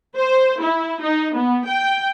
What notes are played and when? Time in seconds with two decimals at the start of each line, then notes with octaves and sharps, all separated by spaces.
0.16 C5
0.62 E4
1.02 D#4
1.33 B3
1.67 G5